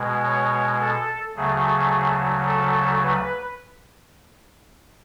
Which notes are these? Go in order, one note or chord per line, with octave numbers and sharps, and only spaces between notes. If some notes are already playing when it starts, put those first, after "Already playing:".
Already playing: B2 G#3
C#5
A4
D2 C#3 F#3 A3 G#4
A4
B4